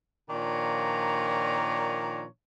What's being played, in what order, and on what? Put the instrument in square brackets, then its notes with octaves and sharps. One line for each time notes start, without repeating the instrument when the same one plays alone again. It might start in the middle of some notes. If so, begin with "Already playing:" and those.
[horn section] A#2 D#3 F3 D4 C#5 A#5